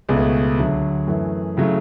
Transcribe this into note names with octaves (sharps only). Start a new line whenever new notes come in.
C#2 B2 A3 G#4
D2 D3 F#3 A3
F#2 E3 A3
C#3 F#3 A3 E4